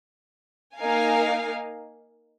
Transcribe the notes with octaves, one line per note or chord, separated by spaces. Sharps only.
A#3 D#4 A#4 F5 G#5